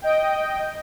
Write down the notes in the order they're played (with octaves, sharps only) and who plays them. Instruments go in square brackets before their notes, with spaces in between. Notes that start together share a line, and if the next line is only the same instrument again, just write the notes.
[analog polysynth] D#5 G5